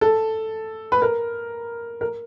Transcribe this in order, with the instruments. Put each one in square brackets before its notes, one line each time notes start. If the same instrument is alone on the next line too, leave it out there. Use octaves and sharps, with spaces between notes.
[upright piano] A4
B4
A#4
A#4